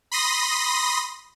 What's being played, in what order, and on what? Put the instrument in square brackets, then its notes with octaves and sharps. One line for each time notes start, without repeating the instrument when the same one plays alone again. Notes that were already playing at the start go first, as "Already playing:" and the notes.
[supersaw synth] B5 C6 D#6 A#6